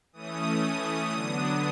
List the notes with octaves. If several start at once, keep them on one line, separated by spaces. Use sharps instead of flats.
E3 A3 C#4 D#6
D3 F#3 B3 D4